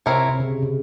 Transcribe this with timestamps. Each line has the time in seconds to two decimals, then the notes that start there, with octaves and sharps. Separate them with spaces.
0.06 C3 C4 E4 A#4 C#5
0.29 C3
0.40 C#3
0.62 C#3